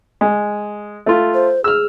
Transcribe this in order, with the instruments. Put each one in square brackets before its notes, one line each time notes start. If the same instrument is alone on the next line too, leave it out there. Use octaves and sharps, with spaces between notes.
[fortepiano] G#3
A3 F4
[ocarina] C5
[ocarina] G#4 [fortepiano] E6 F6